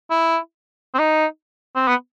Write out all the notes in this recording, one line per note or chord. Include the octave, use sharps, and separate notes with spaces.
E4
C4
D#4
C4
B3